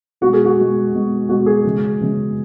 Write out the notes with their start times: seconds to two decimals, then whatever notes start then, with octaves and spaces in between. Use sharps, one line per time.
0.21 B2 G#3 F#4
0.33 G#4
0.45 F#4
0.57 B2 G#3
0.93 B2 G#3
1.29 B2 G#3 F#4
1.46 G#4
1.65 C#3 E3 G#3
2.01 C#3 E3 G#3